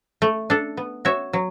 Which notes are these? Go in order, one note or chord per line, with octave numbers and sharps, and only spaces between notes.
A3
D4 A4
B3
F#4 C#5 E5
F#3